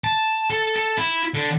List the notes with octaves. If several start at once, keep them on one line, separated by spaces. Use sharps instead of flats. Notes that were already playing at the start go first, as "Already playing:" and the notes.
A5
A4
A4
E4
D3